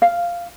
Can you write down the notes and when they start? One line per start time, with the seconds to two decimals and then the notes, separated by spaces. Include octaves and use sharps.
0.02 F5